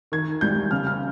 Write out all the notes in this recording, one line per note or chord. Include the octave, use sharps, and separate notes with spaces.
D#3 G#6
G3 G6
C#3 F6
F6